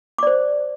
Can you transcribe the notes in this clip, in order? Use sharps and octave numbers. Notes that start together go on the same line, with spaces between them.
C5 D5 D6